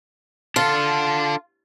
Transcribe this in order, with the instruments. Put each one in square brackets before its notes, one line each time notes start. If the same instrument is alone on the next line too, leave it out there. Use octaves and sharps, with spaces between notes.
[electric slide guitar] D4 A4 [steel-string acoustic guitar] F4